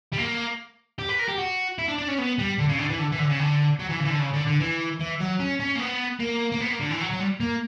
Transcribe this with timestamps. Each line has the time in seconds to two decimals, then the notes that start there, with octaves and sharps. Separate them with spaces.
0.13 G3
0.18 A#3
0.99 G4
1.09 B4
1.19 A#4
1.28 G4
1.38 F#4
1.79 E4
1.88 D4
1.99 D4
2.08 C#4
2.19 B3
2.38 G3
2.58 D3
2.69 C#3
2.79 D3
2.89 E3
2.99 D3
3.12 E3
3.19 D3
3.29 C#3
3.39 D3
3.79 F#3
3.89 E3
4.00 C#3
4.05 E3
4.10 D3
4.19 C#3
4.33 D3
4.47 D3
4.60 E3
5.00 E3
5.20 F#3
5.40 C#4
5.60 C#4
5.75 A#3
5.79 B3
6.20 A#3
6.52 A#3
6.61 B3
6.70 A#3
6.80 D3
6.90 E3
7.00 F#3
7.10 F#3
7.20 G3
7.40 A#3